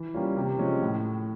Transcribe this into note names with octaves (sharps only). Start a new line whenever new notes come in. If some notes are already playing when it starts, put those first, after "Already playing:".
Already playing: E3
G3 A#3 C#4 F4
C3
F3 G#3 C#4
A2